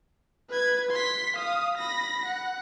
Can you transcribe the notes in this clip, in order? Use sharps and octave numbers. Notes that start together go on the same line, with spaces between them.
B4 G#6
C6 B6
F5 D#6
B5 A#6
F#5